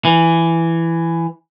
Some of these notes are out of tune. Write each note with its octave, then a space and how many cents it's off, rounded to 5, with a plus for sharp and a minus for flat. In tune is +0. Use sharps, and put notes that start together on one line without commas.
E3 +10